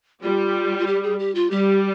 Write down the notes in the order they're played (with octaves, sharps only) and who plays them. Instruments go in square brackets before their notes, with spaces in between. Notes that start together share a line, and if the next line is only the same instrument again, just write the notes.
[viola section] G3 [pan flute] F4
[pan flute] F4
G4
G#4
G4
F4
[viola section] G3 [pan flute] G4